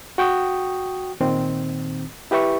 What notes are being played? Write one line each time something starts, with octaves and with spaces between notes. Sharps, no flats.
F#4 G5 C#6 D#6
A#2 D#3 C4
E4 G4 B4 E5 C#6